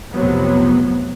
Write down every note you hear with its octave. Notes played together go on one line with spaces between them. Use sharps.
F1 B1 C3 F3 F#3 B3